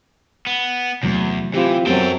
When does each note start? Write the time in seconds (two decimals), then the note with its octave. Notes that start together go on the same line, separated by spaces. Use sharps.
0.47 B3
1.03 E2 C3 F#3 A3
1.54 E3 C4 F4 G4
1.86 F#2 C3 F#3 B3 A4 G5